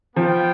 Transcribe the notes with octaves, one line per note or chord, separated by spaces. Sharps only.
F3 B3 F4 C5 G5